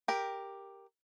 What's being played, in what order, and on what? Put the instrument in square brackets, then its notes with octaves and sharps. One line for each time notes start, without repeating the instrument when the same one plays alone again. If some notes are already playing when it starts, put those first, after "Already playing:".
[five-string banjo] G4 A#4